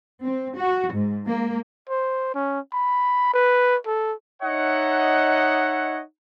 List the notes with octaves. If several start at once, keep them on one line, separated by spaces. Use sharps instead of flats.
C4
F#4
G#2
A#3
C5
C#4
B5
B4
A4
D#4 C#5 D#5 E5 F#5